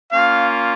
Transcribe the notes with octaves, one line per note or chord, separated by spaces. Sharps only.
A#3 C#4 F4 F5